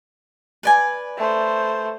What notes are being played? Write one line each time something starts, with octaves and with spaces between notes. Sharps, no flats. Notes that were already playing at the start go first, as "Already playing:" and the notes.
B4 D5 G#5
A3 C5